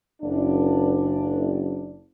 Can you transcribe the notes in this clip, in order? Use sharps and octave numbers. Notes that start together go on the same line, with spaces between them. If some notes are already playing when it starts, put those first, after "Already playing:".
F#1 D4